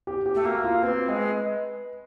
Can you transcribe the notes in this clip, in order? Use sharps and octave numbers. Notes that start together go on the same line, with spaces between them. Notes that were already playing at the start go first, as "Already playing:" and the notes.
G4
G4
A3
A#3 F#4
F4
C4 B4
G#3